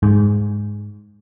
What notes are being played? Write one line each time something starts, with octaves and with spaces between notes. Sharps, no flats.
G#2